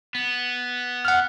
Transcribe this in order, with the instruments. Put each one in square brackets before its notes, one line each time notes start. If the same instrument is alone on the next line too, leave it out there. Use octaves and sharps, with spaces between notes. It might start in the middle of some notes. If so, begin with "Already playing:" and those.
[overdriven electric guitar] B3
[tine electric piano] F#5 F6